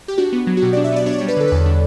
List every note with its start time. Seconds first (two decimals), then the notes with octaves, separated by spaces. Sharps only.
0.08 G4
0.18 D4 F#4
0.32 B3
0.47 F#3
0.57 F#4
0.62 B2 G4
0.73 D5
0.77 D4
0.84 E5
0.92 B3 D5
1.06 D4 C#5
1.13 D5
1.18 C#5
1.21 G3
1.28 B4
1.37 D3 A4
1.48 B4
1.52 E2 A4
1.66 D4